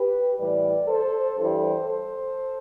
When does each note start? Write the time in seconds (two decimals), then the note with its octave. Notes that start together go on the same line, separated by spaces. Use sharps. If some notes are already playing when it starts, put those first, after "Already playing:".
Already playing: G4 B4
0.38 A2 E3 G3 B4 D5
0.88 A4 C5
1.38 G2 E3 G3 A4 C5
1.88 A4 C5